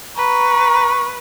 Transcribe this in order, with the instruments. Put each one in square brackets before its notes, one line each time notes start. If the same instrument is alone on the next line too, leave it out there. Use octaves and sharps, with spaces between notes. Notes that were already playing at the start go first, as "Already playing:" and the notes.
[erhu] B4 [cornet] A#5 [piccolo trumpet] C#6